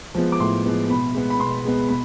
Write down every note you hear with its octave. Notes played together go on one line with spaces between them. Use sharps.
F3 G#3 B3
D6
A2 C6
F3 G#3 B3
B2 B5
G#3 B3
B5
B2 C6
G#3 B3
B2 B5